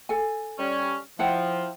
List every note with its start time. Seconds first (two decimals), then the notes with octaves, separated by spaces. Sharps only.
0.09 A4 G#5
0.59 G3 C#4
1.19 F3 E4 F#5 G5